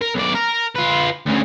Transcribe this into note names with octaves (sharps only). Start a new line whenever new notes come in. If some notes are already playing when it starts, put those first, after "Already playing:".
A#4
B1 D5
A#4
F4 B4
D2 C#3